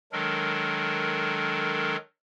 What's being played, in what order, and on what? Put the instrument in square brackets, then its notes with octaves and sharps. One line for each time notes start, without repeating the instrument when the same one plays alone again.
[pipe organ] D#3 F#3 G#3 D4 A4 A#4